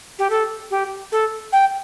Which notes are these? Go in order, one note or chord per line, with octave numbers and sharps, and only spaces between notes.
G4
A4
G4
A4
G5